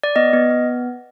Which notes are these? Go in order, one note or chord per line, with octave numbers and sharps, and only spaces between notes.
D5
B3 D#5
B3
B3